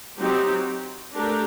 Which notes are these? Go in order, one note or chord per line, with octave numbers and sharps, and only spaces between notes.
F#3 C4 D#4 G4
A3 D4 G4 A#4